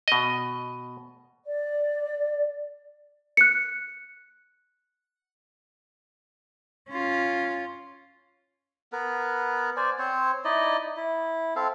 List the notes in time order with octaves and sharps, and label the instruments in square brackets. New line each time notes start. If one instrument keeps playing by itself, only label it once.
[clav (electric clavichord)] B2 D#5
[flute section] D5
[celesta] F#6 C#7
[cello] C#4 F4
[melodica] B3 A#4 B4
C5 D5 G#5
C4 C5 C#5
D#4 E4 D5 D#5
E4
C4 A4 F5